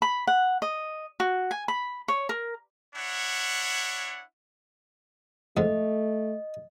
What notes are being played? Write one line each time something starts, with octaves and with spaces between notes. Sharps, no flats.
B5
F#5
D#5
F#4
G#5
B5
C#5
A#4
D4 E4 C#5 F#5
F2 G#2 A3 D#5